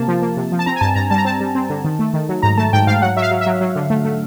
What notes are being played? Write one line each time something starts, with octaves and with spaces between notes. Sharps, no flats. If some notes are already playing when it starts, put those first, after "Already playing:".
Already playing: C3 A#3 A5
F3
A#3
C3
F3
A5
C4 A#5
G#5
G2 A5
G2 A#5
G3 A5
A#5
C4 A5
G3
C4
D3
D#3
A3
D#3
F#3
G#2 A#5
A3 A5
G#2 G5
G#2 F5
F#3 F#5
F#3 E5
F5
F#3
E5
F#3
F#3
D3
A3
A3